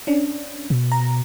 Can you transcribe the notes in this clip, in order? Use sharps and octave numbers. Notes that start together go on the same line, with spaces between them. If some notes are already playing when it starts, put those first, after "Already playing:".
C#4 D4
B2
A#5